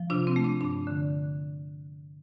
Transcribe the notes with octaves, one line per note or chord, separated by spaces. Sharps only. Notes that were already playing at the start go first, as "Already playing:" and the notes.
Already playing: F3
C3 D4 F4
C4
A3
D4
G2 D4
D3